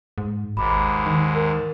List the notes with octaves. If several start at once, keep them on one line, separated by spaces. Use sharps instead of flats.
G#2
G#1 D#2 G#2 B5 D6
D#3
A#4